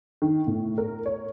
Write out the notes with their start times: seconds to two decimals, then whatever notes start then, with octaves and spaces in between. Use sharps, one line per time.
0.22 D#3
0.47 A2
0.78 A#4
1.06 C#5